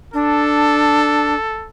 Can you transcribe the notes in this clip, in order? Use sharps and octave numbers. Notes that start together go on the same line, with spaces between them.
D4 A4